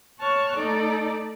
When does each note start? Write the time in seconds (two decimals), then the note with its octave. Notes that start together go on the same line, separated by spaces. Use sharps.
0.20 C#5 A5 C#6 F6 F#6
0.57 A3 D#4 A4 D5